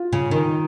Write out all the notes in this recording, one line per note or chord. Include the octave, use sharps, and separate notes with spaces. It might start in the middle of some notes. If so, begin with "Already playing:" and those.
Already playing: F4
C#3
D#3